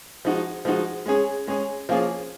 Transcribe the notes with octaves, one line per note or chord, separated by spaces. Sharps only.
F3 G#3 D#4 F#4
F3 G#3 D#4 F#4
G#3 C#4 G#4
G#3 C#4 G#4
F3 A#3 C#4 F4 G#4